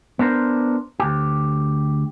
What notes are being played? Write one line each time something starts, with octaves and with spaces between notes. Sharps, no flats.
B3 D4 A#4 C5
D2 G4